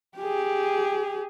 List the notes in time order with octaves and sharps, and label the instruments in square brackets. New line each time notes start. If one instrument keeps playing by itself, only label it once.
[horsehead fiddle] G4 G#4